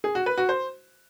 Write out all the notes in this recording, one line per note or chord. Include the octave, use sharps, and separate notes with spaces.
G#4
F#4
B4
F#4
C5